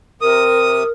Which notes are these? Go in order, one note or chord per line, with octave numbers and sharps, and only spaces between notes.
C3 A#4 D#6